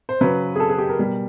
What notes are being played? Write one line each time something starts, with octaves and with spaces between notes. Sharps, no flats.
C5
C#3 F#3 B4
G#4
A4
G#4
G4
A#4
B2 G3